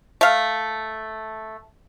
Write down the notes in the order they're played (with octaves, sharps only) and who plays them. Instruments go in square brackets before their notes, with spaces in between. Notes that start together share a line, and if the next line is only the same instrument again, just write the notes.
[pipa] A3 F5